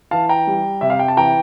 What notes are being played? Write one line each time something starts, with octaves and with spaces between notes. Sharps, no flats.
E3 F5 A5
G5 A#5
G3
C3 E5
F5
G5
A5
E3 G5 A#5